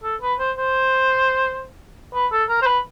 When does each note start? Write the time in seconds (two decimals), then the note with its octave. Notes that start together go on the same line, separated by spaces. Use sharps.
0.03 A4
0.22 B4
0.39 C5
0.57 C5
2.14 B4
2.32 A4
2.49 A#4
2.62 C5
2.67 B4